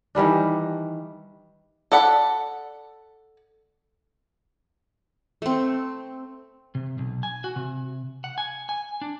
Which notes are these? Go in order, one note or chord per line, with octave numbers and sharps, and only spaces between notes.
D#3 E3 G3 D4
A4 D5 F#5 B5
A3 C4
C3
B1
G#5
F#4
C3
F#5
G#5
G#5
D4